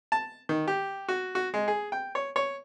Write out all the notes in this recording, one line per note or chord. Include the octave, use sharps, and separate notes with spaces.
A5
D#3
G4
F#4
F#4
G#3
G#4
G5
C#5
C#5